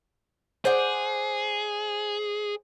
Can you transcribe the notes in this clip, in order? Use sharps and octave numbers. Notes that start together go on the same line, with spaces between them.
G#4 C5 D5 F#5